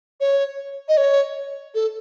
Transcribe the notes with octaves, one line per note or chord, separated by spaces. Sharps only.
C#5
D#5
C#5
A4